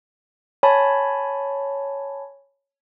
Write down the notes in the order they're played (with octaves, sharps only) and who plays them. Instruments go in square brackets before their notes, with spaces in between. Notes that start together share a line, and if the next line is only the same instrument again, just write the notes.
[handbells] C#5 G#5 A5 B5